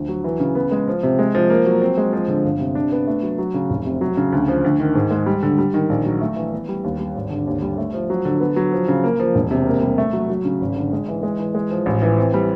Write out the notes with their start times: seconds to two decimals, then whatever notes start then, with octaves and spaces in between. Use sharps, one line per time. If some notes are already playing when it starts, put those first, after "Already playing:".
Already playing: D2 F3
0.09 F#3
0.24 E3
0.40 C#3
0.55 B3
0.72 G#3
0.88 F3
1.03 C3
1.19 G#3
1.35 F3
1.50 A#3
1.66 F#3
1.82 C4
1.98 G#3
2.13 F3
2.28 D3
2.44 G1
2.60 C3
2.75 D4
2.92 B3
3.07 A3
3.23 F#3
3.38 F#3
3.54 C#3
3.70 F1
3.85 C3
4.01 F#3
4.17 C#3
4.32 D2
4.48 F3
4.64 D2
4.80 D#3
4.95 G#2
5.11 G#3
5.26 G3
5.43 D3
5.58 G3
5.74 D#3
5.89 A#1
6.06 F#3
6.21 A3
6.36 E3
6.53 B3
6.69 G3
6.84 D#2
6.99 G3
7.16 G#1
7.30 D3
7.47 D#2
7.62 G3
7.78 A3
7.93 F3
8.10 F#3
8.25 D3
8.40 B3
8.56 F#3
8.73 F3
8.88 C#3
9.04 A#3
9.20 F3
9.35 E1
9.51 C3
9.67 A#3
9.82 G3
9.98 A3
10.13 F#3
10.29 F#3
10.45 C#3
10.61 G#1
10.76 D3
10.93 G#3
11.08 E3
11.23 G#3
11.39 E3
11.55 G#3
11.71 F3
11.86 A1
12.02 E3
12.18 C4
12.34 G3